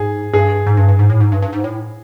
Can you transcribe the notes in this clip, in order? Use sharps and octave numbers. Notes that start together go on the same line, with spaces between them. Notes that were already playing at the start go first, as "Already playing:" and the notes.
Already playing: G#2 G#4
G2 G#4
G#2
G2
G2
G#2
A2
G#2
G2
G2
G#2
A2